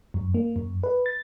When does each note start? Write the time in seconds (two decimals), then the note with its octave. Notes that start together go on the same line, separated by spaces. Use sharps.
0.14 F#2
0.34 A#3
0.56 F#2
0.83 B4
1.06 A6